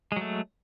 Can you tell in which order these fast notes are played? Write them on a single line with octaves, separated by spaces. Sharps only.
G#3 F#3 A3